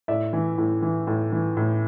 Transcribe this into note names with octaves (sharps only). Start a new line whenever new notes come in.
A2 D5 E5
E3
A2
E3
A2
E3
A2